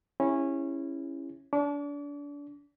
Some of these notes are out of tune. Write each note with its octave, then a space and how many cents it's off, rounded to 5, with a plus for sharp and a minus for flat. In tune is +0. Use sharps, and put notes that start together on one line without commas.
C#4 -15 E4 +0 G#4 -45
D4 -30 D6 -40